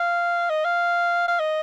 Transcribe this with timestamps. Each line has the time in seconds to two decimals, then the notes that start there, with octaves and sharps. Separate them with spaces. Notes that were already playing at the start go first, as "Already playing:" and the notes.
Already playing: F5
0.50 D#5
0.64 F5
1.28 F5
1.40 D#5